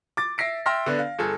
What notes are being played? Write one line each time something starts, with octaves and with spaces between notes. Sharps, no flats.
D6 A6
E5 A#6 C7 D7
E5 G5 C6 E6 F6 A#6
D3 B3 D4
F5
G1 G#4 A4